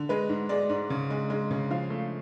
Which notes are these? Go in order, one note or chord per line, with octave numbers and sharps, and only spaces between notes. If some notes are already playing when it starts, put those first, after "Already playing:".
Already playing: D3
G#3 B4
G#2
G#3 D5
G#2
C#3
G#3
G#3
C#3
F3 F5
A3